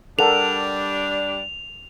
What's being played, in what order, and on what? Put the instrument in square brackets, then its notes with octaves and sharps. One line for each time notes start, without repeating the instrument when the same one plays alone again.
[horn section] G3 D4 [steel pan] A4 A#4 F#5 [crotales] F7